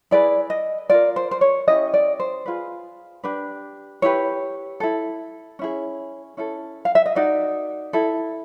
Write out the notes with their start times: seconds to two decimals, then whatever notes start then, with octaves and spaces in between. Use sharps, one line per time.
0.11 E4 G#4 B4 D5
0.50 D#5
0.90 F4 A#4 D5
1.16 C5
1.31 C5
1.41 C#5
1.68 C#4 E4 G4 D#5
1.94 D5
2.20 C5
2.46 F4 G#4 B4
3.24 D4 G4 B4
4.02 E4 G4 B4 C#5
4.80 E4 A4
5.59 C#4 E4 G#4
6.37 C#4 E4 A4
6.85 F5
6.95 E5
7.06 D#5
7.15 D#4 F#4 A#4 D5
7.93 E4 A4